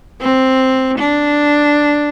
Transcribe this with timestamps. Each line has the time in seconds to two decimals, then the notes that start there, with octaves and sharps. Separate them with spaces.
0.21 C4
0.98 D4